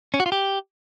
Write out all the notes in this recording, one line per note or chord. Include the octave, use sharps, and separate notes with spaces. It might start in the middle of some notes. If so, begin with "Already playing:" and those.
C#4
F#4
F4
G4